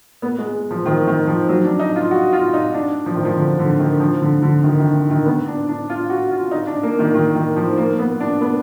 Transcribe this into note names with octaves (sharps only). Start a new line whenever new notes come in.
B3
G#3
F3
D#3
D#3
F3
F#3
D4
D#4
F4
F#4
F4
D#4
D4
F3
D#3
F3
D3
D3
D#3
F3
D3
D3
D#3
D#3
D#3
D#3
B3
D4
D4
F4
F#4
F4
D#4
D4
A#3
D#3
D#3
D#3
F3
A#3
B3
D4
B3